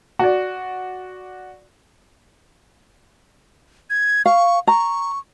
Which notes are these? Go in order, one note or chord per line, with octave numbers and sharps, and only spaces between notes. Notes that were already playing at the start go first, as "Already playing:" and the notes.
F#4 D5
G#6
F5 C#6
A#5 C#6